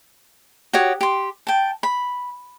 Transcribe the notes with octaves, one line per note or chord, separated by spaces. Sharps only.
F#4 G4 C#5 D#6
G4 C6
G5 A5
B5